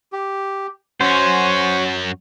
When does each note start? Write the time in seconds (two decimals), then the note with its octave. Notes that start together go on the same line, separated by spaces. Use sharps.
0.13 G4
1.01 F#2 C#4 F#4 C5 C#5